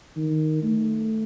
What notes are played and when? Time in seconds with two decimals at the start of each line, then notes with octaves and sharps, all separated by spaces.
0.16 D#3
0.63 A3